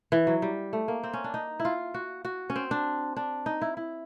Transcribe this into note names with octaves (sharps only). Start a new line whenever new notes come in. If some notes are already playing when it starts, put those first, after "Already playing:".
E3
F#3
G3
A3
A#3
C4
C#4
D4
D#4
E4
F4
F#4
F#4
C#4
C4
D4
D4
D#4
E4
E4